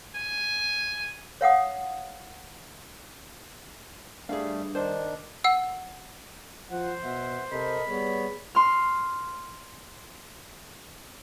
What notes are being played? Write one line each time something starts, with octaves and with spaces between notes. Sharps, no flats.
G#5
C#5 F5 F#5 D#6
G2 G3 A3 G#4 F5
D#3 D4 C5
F#5 E6
F3 C5 F#5
B2 E5 F#5
C3 A4 A#4 D#5 B5
G3 B3 G#4 C#5
C6 F6